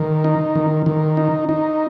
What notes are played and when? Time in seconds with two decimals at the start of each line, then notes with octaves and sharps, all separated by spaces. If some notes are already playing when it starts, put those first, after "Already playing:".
Already playing: D#3
0.24 D#4
0.55 D#3
0.86 D#3
1.17 D#4
1.49 D#4